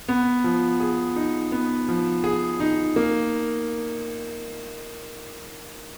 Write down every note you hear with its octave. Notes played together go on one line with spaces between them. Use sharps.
B3
F3
G#4
D#4
B3
F3
G#4
D#4
A#3